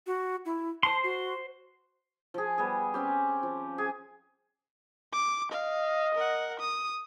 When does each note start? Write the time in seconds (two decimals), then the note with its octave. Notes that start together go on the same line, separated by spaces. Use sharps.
0.07 F#4
0.45 E4
0.83 C5 A5 C6
1.03 F#4
2.34 F3 G#4
2.58 G3 B3 G#4
2.94 C4 C#4 G4
3.43 F3
3.78 G#4
5.13 D6
5.52 D#5 F5
6.15 A#4 F#5
6.60 D#6